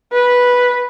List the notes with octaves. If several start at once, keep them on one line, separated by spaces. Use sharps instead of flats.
B4